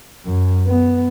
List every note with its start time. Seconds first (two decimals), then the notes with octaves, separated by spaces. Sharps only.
0.25 F#2
0.67 B3